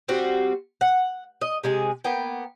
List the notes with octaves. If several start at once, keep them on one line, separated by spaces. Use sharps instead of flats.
G3 C4 F#4
F#5
D#5
C3 G#3 G#4
A#3 B3 G5